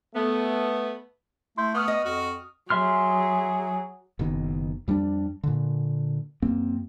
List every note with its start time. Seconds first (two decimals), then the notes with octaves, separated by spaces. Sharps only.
0.13 A3 B3
1.57 A3 E4 C6 G6
1.74 B3 C#6 D#6 F6
1.88 D#5
2.05 F2 F#4
2.70 F#3 G#4 E5 C6 F6
4.19 F#1 B2 D#3
4.88 F2 G3 C#4 D4
5.43 A#2 D3
6.42 F#2 A#3 C4